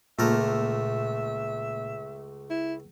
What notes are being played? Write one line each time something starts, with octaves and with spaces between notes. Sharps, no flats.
C#2 A#2 A3 A#4 E5
E4